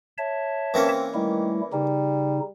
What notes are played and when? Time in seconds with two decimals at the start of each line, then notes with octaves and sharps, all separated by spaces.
0.18 C#5 E5 A5
0.74 E3 A#3 C4 C#4
1.14 D#3 G3 A3 E4
1.73 C#3 G3 D#4